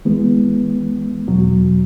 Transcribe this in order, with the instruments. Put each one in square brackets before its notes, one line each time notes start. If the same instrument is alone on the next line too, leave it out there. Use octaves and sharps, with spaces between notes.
[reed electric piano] E3 G#3 B3
E2 B2 F#3